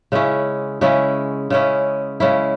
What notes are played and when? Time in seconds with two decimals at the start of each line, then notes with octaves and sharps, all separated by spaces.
0.12 C#3 G#3 C#4 E4
0.81 C#3 G#3 C#4 E4
1.50 C#3 G#3 C#4 E4
2.20 C#3 G#3 C#4 E4